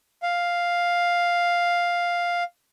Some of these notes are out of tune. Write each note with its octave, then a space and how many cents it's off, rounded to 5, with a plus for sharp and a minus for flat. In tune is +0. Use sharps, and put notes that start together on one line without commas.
F5 +5